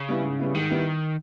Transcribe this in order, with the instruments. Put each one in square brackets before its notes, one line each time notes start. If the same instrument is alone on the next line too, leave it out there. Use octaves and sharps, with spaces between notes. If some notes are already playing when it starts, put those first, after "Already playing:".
Already playing: [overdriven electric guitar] C#3
[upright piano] G3 B3 E4
G#2
G3 B3 E4
[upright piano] G#2 [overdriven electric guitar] D#3
[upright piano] G3 B3 E4